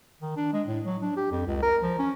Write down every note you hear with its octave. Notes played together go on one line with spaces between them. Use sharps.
D#3
D4
G#3
A2
F#3
D4
G4
F2
C#2
A#4
F3
C#4